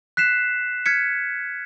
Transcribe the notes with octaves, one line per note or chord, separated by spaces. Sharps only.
F#6 B6 C7 E7
F6 G#6 B6 C#7